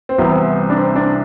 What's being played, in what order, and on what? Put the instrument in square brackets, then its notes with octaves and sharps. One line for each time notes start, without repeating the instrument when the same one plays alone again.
[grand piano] C4
C2 C3 E3 B3
D4
C4
D4